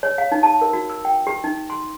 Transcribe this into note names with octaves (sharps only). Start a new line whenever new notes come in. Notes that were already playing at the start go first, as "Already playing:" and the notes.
C#5
F5
D#4
A5
A#4
F#4
E6
G5
G4
D#4
C6